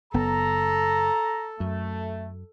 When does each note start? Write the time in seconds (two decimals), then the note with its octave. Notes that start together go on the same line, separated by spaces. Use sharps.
0.14 F#1 B3 A4 A#5
1.60 F#2 A3